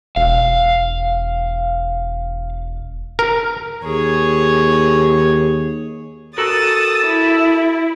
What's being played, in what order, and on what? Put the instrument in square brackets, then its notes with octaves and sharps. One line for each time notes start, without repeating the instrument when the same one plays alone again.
[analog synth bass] E1 [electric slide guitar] F5
[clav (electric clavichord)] A#4
[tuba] D#2 [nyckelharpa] G#4 C#5
[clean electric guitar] F#4 A4 A#4 [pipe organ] A5 E6 [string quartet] D#6 A6
[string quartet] E4